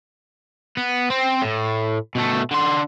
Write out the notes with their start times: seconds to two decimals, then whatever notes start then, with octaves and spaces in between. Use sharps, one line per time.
0.77 B3
1.10 C4
1.42 A2
2.15 B2 A3
2.51 D3 C6